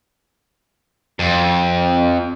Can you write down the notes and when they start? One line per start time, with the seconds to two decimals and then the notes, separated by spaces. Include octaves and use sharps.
1.19 F2